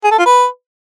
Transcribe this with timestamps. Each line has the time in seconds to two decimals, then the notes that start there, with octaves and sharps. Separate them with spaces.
0.04 G#4
0.11 A4
0.18 F4
0.26 B4